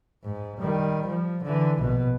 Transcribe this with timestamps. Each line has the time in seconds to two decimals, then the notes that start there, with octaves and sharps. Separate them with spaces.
0.24 G#2
0.59 D#3 G3
1.06 F3
1.43 D3 E3
1.80 A#1 B2